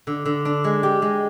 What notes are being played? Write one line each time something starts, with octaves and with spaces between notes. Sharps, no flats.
D3
D3
D4
G#3
G4
G#3